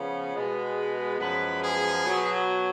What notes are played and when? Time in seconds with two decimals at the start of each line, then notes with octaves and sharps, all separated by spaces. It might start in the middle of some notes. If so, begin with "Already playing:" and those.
Already playing: C#3 F3 B3
0.35 B2 G#3 B3
1.19 F#2 F3 G#3 B3 B4
1.61 G#4
2.04 B2 F#3 B3